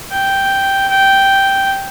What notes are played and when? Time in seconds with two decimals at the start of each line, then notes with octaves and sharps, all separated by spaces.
0.11 G5
0.90 G5